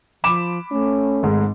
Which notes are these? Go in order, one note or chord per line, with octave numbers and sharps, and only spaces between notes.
F3 B5 D6 E7
A3 C#4
G#1 G#2 G#3